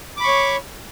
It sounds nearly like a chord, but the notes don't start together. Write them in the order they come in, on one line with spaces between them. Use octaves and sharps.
D6 B5 C#6 C#5